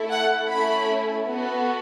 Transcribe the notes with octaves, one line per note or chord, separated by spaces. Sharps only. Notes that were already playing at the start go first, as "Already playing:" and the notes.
Already playing: A3 E4 A4
F#5
A3 C#4 E4 B5
B3 F#4 A4